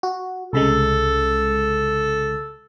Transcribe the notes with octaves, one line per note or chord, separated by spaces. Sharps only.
F#4
C2 C#3 G#3 A4